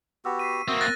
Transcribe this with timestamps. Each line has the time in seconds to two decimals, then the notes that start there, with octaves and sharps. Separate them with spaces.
0.25 B3 F#4 G4 C#6 E6
0.39 C#6 B6 C7 D#7
0.68 A#3 C4 F#4 A#4 E5 D#6 E6
0.81 F#6 A6 A#6